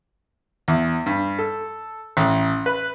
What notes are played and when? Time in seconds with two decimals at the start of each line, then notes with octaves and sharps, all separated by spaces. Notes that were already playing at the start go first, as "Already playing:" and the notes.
0.68 E2
1.06 G2
1.39 A4
2.17 A1
2.66 B4